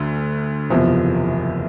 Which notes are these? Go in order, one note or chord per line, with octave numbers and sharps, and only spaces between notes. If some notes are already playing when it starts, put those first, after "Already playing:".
Already playing: D2 D3
F#1 E2 C3 F3